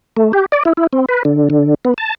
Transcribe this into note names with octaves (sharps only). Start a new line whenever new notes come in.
A3
G4
D5
E4
E4
C4
B4
D3
D3
B3
A5